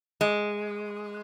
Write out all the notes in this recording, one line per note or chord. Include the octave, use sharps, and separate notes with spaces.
G#3